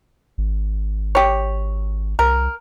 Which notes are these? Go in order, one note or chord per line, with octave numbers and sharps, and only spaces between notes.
G#1
G4 C#5
C2 A#4